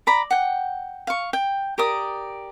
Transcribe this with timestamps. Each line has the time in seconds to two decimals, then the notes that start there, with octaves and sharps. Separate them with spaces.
0.07 D5 A#5 B5
0.31 F#5 G5
1.07 F5 C#6
1.33 G5
1.78 G4 A#4 D5 D#6